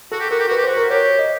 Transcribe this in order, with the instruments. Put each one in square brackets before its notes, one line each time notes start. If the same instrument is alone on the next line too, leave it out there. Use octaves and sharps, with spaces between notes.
[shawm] F#4 [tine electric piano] A4
[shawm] G4
[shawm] F#4 [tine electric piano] A#4
[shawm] G4
[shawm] F#4 [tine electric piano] B4
[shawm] G4
[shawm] F#4 [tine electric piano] C5
[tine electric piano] A#4
[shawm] G4 [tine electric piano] C#5
[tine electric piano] D#5